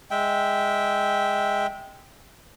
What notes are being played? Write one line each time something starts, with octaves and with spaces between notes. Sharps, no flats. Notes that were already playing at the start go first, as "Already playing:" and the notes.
G#3 E5 G5